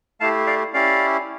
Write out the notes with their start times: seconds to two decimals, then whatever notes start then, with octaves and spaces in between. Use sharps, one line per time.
0.20 A3 E4 G4 F5 A5
0.47 D5 F5
0.74 C#4 E4 G4 D5 F5